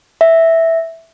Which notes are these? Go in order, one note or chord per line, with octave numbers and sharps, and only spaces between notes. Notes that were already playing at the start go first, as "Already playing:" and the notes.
E5